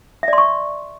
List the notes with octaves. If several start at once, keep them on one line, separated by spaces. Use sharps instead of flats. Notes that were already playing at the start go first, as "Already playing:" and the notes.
D5 E5 C6 C#6